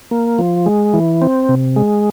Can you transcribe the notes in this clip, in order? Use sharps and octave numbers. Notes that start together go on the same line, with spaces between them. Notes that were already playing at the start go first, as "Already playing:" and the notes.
A#3
F3
G#3
E3
C4
C3
G#3